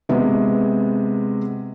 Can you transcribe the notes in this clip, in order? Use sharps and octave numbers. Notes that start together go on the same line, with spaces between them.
C3 G#3 B3